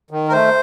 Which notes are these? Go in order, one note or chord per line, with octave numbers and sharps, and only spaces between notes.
D#3
A#4
A3 C5